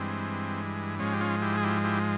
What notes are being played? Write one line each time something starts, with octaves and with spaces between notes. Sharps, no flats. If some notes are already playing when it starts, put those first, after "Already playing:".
Already playing: G2 E3 G#3 C4
G#2 F3 G#3 C#4
G4
C#4 F4
E4 G4
G#4
E4 G4
E4 G4